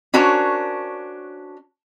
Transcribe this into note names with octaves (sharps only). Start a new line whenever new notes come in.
C#4 D4 F#4 A#4 C5 C#5